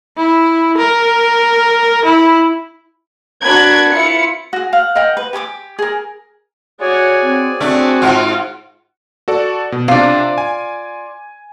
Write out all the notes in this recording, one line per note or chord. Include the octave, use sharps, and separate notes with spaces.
E4
A#4
E4
D4 F#4 A#4 B5 F#6 G#6
E4 F4 C#7
F#4 G#4
F5 F#5
A#4 D#5 F#5 G5
B4
G4 G#5 C#6 D6
G#4 A#4
F#4 G#4 C#5 D5 G#5
C4
A3 C4 D4 F#4
G#2 F4
F#4 A4 D5
B2
C3 D4 F4 D5
G#5